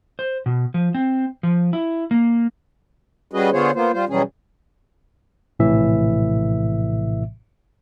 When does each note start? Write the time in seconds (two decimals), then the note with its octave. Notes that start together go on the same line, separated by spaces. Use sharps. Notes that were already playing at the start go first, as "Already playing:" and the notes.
0.19 C5
0.46 B2
0.74 F3
0.95 C4
1.43 F3
1.73 E4
2.11 A#3
3.31 G3 C#4 F#4 G#4 B4 D#5
3.52 D3 B3 F4 G#4 C5 C#5
3.75 A#3 B3 F4 C5
3.93 G3 F4 C5
4.09 B2 E3 F#3 G3 C#4 G#4
5.59 A#1 A2 C3 E3 E5